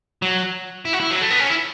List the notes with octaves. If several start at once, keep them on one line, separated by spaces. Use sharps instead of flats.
F#3
E4
F#4
E4
F#3
A3
B3
C#4
E4